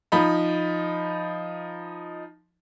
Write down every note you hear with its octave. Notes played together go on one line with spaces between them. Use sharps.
F3 D#4 B5